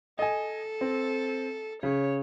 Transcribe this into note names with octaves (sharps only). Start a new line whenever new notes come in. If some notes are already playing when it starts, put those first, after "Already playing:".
A4 D#5 G#5
C4
C#3 C#5